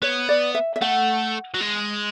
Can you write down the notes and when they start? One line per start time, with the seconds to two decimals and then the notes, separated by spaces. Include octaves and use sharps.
0.02 B3 C#5
0.29 D5
0.55 E5
0.76 E5
0.82 A3 F#5
1.54 F#3
1.61 G#3